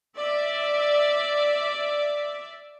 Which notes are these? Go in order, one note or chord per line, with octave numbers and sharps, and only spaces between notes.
D5 E5